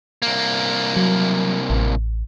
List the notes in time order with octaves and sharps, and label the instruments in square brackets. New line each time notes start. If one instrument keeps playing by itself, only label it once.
[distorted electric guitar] C2 A#3
[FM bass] F#3
A1